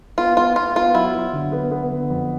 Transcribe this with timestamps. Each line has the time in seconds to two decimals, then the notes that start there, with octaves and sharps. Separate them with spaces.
0.18 B3 F4
0.37 B3 F4
0.56 B3 F4
0.75 B3 F4
0.94 F#3 E4
1.15 F#3
1.33 D3
1.52 B3
1.71 B3
1.91 D3
2.10 F2